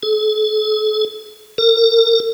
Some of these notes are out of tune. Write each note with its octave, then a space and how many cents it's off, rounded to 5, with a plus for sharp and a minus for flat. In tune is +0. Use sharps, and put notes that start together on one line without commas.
A4 -45
A#4 -40